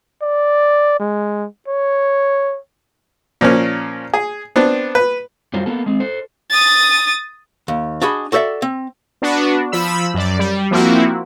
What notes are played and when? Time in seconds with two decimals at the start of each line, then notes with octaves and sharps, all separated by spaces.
0.22 D5
1.00 G#3
1.68 C#5
3.41 A#2 F3 A#3 C#4
4.14 G#4
4.56 B3 C4 D4
4.95 B4
5.53 F#2 F#3 G3 F4 C5
5.66 A#3 B3 A4
5.86 G#3 C4
6.00 A4 C5
6.50 D#6 A6
7.68 D#2
8.02 D4 F#4 G#4 D#5 B5
8.32 F#4 A4 C5 D5 E5
8.62 C4
9.22 B3 D4 F#4
9.72 F3 B5 E6
10.14 F#2 D5
10.39 G3
10.71 F3 A#3 C4 E4 F#4